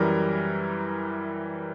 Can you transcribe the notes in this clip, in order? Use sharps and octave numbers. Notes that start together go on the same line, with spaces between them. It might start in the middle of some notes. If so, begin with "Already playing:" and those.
Already playing: F#2 E3 G3 A#4